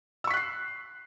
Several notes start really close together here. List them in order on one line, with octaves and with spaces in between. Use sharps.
E6 C#6 B6 F#6 C7